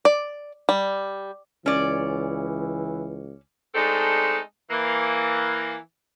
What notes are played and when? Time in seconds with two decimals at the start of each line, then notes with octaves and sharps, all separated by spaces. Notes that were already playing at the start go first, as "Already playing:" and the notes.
0.05 D5
0.69 G3
1.66 C#2 E3 C#4 D5
3.75 G#3 A3 C4 D4 D#4 A4
4.70 E3 A#3